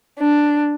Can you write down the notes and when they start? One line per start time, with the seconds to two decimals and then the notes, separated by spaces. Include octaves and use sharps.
0.19 D4